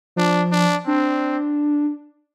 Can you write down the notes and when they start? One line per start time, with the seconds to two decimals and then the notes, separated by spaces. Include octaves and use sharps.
0.16 F3 D4
0.51 D4
0.87 C4 D4